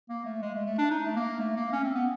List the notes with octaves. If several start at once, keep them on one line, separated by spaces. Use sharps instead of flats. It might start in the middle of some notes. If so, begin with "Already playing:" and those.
A#3
A3
G#3
A3
A3
D4
D#4
A3
A#3
A3
A#3
C#4
C4
B3